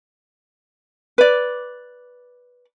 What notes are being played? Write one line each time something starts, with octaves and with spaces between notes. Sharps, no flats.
B4 D5